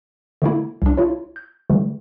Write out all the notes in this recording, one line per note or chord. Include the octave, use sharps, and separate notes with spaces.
D3 A3 A#3 E4
C2 D4
E4 F4 C#5
G6
D3 E3 G3 A3